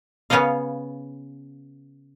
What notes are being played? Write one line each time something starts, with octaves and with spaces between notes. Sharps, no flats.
C#3 B3 C#4 B4 D#5 F5